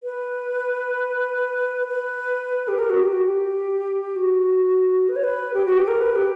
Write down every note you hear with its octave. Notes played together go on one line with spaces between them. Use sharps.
B4
B4
G4
A#4
F#4
G4
F#4
G4
F#4
B4
C#5
B4
G4
F#4
G4
A#4
B4
G4